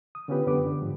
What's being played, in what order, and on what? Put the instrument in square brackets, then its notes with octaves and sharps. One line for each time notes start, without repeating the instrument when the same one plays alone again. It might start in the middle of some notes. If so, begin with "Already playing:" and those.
[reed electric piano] D#6
D3 B3 C#4 F4 G4 B4
F#2 D3 B3 G4 B4 D6
D3
G#2 F3